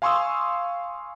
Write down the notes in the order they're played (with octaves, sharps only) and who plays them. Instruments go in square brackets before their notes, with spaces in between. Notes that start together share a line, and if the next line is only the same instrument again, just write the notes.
[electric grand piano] F5 G#5 C6 C#6 D#6 E6